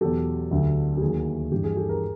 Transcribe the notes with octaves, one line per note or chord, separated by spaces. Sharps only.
E2 B2 F#3 G4 A4
D2 D3 F#3
G4
D#2 D#3 F#3 G#4
G2 E3 G4
G#4
G4 A4
G#4 A#4